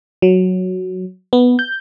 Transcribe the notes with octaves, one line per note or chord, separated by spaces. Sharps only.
F#3
B3
G6